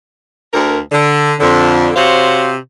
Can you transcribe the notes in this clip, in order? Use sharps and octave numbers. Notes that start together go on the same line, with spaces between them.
D2 A#4
D3
F2 D3
C3 F#4 C5 C#5 F5